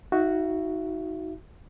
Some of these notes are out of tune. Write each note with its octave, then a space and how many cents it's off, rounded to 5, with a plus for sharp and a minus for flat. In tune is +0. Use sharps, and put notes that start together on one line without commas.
D#4 +30 F#4 +0 E5 +35